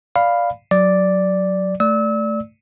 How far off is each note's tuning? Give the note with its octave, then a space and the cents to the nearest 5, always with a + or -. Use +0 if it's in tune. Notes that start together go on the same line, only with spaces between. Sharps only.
D5 +0 F5 +0 B5 +5
F#3 +0 D5 +0
A3 +0 D5 +0 E6 -35